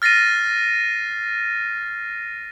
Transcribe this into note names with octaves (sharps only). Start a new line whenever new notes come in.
F6 A6 A#6 C7 D#7